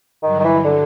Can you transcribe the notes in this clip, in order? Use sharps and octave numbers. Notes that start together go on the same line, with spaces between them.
G2 D3 D#3 F#3
D#3
E3
D3